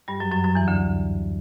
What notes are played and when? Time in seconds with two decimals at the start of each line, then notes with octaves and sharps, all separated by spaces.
0.08 G2 G3
0.20 F#2 F#3
0.32 F#2 F#3
0.44 F#2 F#3
0.55 E2 E3
0.68 D2 D3